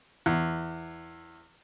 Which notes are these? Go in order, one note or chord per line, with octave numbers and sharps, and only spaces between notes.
E2